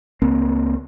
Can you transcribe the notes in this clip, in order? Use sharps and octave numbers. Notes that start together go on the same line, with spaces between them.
C#2 A#3 C4